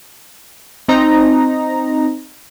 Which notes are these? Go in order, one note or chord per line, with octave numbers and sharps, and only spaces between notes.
C4 D#4 A#5